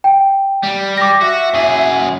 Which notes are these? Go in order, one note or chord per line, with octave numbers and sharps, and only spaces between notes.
G5
G3
G5 D6 A#6
F#4 E5
F#2 G#4